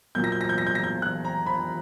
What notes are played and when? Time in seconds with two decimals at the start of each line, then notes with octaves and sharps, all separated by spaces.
0.15 A#2 F#3 A#3 G6
0.24 A#6
0.32 G6
0.41 A#6
0.49 G6
0.58 A#6
0.67 G6
0.75 A#6
0.84 G6
1.02 F#6
1.25 A#5
1.46 B5